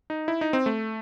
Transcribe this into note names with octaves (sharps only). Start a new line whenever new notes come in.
D#4
E4
D#4
C4
A3